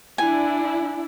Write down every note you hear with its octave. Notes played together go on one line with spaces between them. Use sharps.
D4 E4 G#5